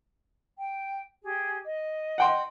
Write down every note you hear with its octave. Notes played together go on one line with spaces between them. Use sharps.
G5
G4 G#4
D#5
F#5 G5 C6